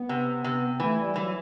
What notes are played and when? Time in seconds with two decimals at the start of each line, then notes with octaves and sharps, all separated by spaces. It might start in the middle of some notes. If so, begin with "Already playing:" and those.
Already playing: B3
0.09 C3
0.44 C3
0.80 E3 A3
0.98 G3
1.16 E3 F#3